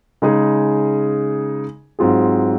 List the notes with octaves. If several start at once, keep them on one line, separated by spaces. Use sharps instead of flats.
C#3 G#3 D#4 G#4
G#2 F#3 C4 F4 G#4